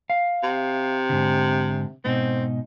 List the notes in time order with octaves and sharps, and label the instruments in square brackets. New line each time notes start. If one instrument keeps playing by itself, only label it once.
[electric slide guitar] F5
[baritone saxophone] C3
[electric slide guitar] G#2 D3
[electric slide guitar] G#2 B2 D#4 [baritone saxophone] C4